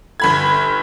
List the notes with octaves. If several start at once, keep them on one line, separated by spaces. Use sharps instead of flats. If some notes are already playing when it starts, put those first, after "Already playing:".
G1 B5 G#6